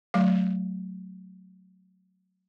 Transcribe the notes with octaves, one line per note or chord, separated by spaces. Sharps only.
F#3 A3 F5